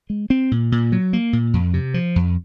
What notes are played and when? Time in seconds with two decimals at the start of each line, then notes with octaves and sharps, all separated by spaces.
0.10 G#3
0.30 C4
0.51 A#2
0.72 A#2
0.92 F#3
1.13 A#3
1.33 A#2
1.54 F2
1.74 C3
1.94 F3
2.16 F2